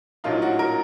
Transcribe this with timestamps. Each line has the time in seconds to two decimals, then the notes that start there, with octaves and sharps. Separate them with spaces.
0.24 A#1 A2 F#3 A#3 D#4 F4
0.42 F#4
0.59 A#4